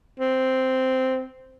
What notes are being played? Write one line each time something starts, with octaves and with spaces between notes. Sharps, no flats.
C4